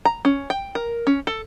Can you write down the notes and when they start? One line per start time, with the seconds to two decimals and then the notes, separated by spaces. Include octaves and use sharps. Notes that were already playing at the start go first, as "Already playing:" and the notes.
0.05 A#5
0.25 C#4
0.50 G5
0.75 A#4
1.07 C#4
1.27 A4